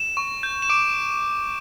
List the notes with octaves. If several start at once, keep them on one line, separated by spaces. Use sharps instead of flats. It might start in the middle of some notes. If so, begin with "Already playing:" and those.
Already playing: E7
C#6
G6
E7
D6 D7